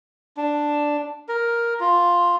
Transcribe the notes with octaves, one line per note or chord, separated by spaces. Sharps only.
D4
A#4
F4